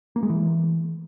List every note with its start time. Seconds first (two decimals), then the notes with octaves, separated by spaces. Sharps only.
0.16 A#3
0.23 G#3
0.30 E3